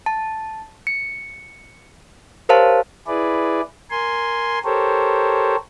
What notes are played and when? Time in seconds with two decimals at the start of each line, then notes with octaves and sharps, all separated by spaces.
0.06 A5
0.87 C#7
2.49 G4 A#4 C5 C#5 F5 A5
3.07 E4 G#4 B4 D5
3.91 A#4 G#5 C6
4.64 G4 A4 A#4 C5 C#5